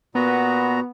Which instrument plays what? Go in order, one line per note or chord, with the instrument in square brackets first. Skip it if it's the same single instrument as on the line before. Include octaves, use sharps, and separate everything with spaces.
[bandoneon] A#2 F#4 A#5 [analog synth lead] B3